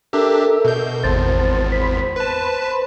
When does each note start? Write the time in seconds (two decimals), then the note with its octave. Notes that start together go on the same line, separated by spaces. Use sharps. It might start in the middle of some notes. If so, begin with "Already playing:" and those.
0.13 D4 G4 A4 A#4 E5
0.65 B2 G6
1.04 G#1 E2 C5 A5
1.72 C5 B5
2.16 B4 A5